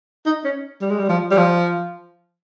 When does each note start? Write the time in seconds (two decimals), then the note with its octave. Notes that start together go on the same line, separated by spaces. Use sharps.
0.26 D#4
0.44 C#4
0.81 G3
0.90 G#3
0.99 G3
1.09 F3
1.31 G3
1.37 F3